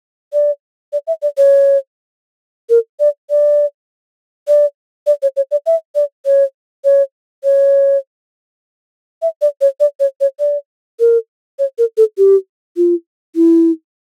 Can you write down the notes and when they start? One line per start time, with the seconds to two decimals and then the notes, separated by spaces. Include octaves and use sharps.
0.33 D5
0.93 D5
1.07 E5
1.22 D5
1.38 C#5
2.70 A#4
3.00 D5
3.30 D5
4.48 D5
5.07 D5
5.22 C#5
5.37 C#5
5.51 D5
5.66 E5
5.95 D5
6.26 C#5
6.85 C#5
7.44 C#5
9.22 E5
9.42 D5
9.61 C#5
9.80 D5
10.00 C#5
10.21 C#5
10.40 D5
11.00 A#4
11.59 C#5
11.78 A#4
11.97 A4
12.18 G4
12.77 F4
13.35 E4